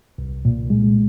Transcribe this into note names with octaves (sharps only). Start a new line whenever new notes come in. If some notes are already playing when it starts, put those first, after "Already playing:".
C2
A#2
G#3